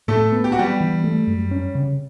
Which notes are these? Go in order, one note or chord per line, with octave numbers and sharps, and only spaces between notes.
A2 A3 A4
B3
G4
F#4
G3 B3 G4
E3
A3
F#2
C#4
C#3